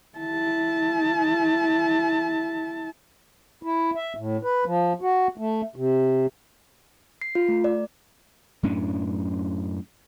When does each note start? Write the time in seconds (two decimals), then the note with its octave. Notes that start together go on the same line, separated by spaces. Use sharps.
0.19 E4 A5
3.63 E4
3.95 E5
4.17 A2
4.43 B4
4.65 F3
5.01 F#4
5.38 A3
5.76 C3
7.21 C7
7.35 F4
7.48 A3
7.64 D5
8.63 F#2 A2 C#4 D4